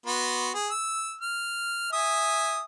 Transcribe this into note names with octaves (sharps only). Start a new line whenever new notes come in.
B3 F#4 C6
G#4
E6
F6
E5 G#5 D#6